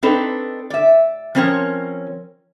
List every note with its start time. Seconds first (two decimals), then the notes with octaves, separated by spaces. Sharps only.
0.03 C4 D4 D#4 A4 B4
0.70 D5 E5
1.35 F3 C4 C#4 A#4 C#5